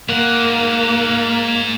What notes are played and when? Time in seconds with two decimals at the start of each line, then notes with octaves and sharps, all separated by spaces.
0.09 G#2 A#3 F#5